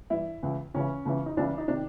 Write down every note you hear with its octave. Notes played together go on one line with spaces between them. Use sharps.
G2 E3 E4
C#2 C#3 E3
C#2 C#3 E3 C#4
C#2 C#3 E3
D#4
C#2 C#3 E3 D4
D#4
C3 D#3 D4